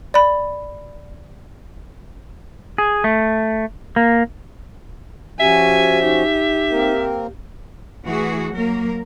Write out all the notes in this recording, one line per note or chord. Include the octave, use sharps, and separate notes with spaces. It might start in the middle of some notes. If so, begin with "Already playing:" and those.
D5 B5
G#4
A3
A#3
F3 C#4 F#4 G4 E5 G#5
D#4 G4
A#3 C4 A#4
E3 A3 F#4 G#4
F#3 A#3 A#4